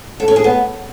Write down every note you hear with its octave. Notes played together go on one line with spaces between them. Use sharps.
A4
C#4
G#4
B3